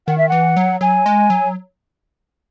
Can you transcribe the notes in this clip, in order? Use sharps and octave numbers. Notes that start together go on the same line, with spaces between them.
D#3 F#5
E5
E3 F#5
F#3
F#3 G#5
G#3
F#3